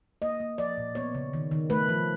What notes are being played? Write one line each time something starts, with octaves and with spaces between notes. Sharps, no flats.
A#3 D#5
A#3
F3 D5
A#2
B3 C#5
C#3
D#3
D#3
A3 B4
F3